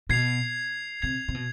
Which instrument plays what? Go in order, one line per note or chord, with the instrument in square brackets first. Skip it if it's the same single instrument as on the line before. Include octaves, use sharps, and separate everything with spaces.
[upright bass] B2 [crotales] G#6 C7 F7
[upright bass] C3 [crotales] G#6 C7 F7
[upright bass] C3
B2